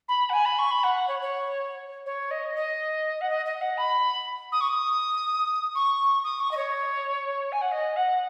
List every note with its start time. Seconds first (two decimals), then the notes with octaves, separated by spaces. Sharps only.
0.08 B5
0.30 F#5
0.33 G#5
0.45 B5
0.59 C#6
0.71 B5
0.83 F#5
1.08 C#5
1.22 C#5
2.06 C#5
2.31 D#5
2.55 D#5
3.21 F#5
3.30 D#5
3.46 D#5
3.61 F#5
3.78 B5
4.52 D#6
4.61 C#6
4.69 D#6
5.75 C#6
6.24 D#6
6.40 C#6
6.51 D#5
6.57 C#5
7.52 G#5
7.61 F#5
7.72 D#5
7.96 F#5